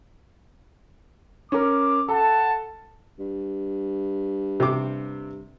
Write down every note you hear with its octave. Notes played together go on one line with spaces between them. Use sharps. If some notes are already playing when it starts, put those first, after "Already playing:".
C#4 A#4 D6
A4 F#5 A5
G2
C3 C4 D6